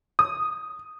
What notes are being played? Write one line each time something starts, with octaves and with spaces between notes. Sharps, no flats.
D#6